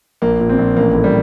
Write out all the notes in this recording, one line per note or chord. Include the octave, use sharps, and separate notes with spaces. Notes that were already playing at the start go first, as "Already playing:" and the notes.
A#1 A#3
A#2
C4
A#1
A1 A#3
A2
G3